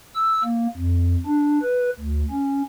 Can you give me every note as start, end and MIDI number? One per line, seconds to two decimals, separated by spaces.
0.15 0.42 88
0.44 0.67 58
0.77 1.16 41
1.26 1.59 62
1.62 1.90 71
2.00 2.23 38
2.31 2.62 61